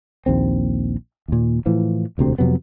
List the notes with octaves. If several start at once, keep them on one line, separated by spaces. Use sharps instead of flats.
A#1 D#2 C4
D#2 A#2
A2 E3 F3
E1 D2 C3 C4
F2 C3 F#3 B3